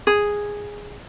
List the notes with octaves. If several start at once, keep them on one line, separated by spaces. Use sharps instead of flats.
G#4